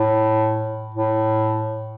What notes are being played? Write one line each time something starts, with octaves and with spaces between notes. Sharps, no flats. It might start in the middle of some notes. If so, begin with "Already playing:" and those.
Already playing: A2
A2